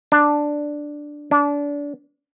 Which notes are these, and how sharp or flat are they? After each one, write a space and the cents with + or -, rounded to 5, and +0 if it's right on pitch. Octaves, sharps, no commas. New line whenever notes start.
D4 +5
D4 -25